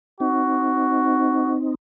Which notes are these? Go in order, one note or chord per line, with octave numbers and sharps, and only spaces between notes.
C4 D#4 F#4